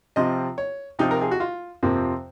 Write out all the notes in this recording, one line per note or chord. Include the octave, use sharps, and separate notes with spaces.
C3 F3 C4 F4 D#5
C#5
C3 F3 C4 D#4 F4
A#4
G#4
F#4
F4
F2 C3 F3 A#3 C4